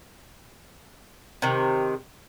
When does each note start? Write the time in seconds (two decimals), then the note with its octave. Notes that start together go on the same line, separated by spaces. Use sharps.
1.42 C3 D#3